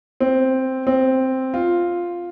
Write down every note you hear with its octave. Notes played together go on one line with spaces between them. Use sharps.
C4
C4
F4